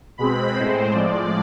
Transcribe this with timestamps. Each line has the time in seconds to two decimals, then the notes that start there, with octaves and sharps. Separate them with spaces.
0.18 B2 G#3 C4 B5
0.55 A2 G#3 C4 C5
0.93 A2 F3 G#3 D5